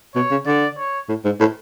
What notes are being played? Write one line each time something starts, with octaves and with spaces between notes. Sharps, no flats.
B2 C#5
C#3
D3 D5
C#5
A2
G#2
A2